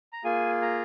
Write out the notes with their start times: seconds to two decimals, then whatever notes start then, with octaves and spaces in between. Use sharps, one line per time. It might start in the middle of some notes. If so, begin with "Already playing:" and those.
0.13 A#5
0.24 A#3 F4 G#4 G#5
0.62 A#5